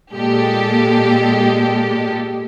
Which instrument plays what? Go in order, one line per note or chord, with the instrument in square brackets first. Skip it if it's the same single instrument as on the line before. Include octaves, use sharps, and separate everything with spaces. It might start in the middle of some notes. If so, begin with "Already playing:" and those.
[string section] A#2 G#3 G4 A4